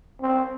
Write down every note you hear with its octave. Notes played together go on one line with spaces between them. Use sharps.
C4